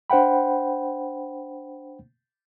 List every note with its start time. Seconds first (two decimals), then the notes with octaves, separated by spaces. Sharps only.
0.10 D4 C5 F#5 G5 B5